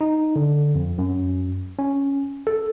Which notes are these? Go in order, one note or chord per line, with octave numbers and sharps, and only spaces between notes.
D#4
D3
F2
F#2
C#4
A4